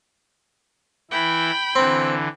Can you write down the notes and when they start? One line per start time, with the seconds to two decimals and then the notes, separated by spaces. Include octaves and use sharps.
1.11 E3 E4 G5 B5
1.76 D3 E3 C4